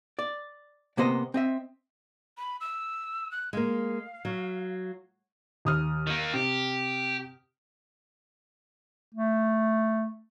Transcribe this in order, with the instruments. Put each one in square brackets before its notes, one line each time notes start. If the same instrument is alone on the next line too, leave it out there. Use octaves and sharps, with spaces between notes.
[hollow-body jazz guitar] D5
C3 A#3 B3 C5 D#5
C4 D#5 E5
[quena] B5
E6
F#6
[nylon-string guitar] G#3 A#3 [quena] F5
[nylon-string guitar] F#3
[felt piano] D#2 D#6 F6
[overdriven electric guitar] D#3 A#3
[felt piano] C3 [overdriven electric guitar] G4
[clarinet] A3